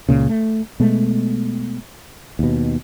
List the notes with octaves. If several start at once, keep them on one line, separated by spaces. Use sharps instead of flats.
C#2 A#2 C#3
A3
B2 G#3 A3
D#2 B2